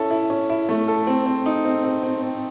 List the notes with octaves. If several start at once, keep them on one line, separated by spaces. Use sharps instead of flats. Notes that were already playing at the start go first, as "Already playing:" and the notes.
Already playing: C#4 E4 A4
E4
C#4
E4
A3
A4
C4
C4
D#4
C4
C4
C4
C4